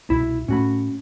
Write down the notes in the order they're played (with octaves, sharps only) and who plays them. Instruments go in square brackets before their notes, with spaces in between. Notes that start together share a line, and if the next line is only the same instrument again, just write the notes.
[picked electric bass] C2 B2 [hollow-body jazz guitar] E4
[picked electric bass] A2 A3 [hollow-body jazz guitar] C#4 F#4 B5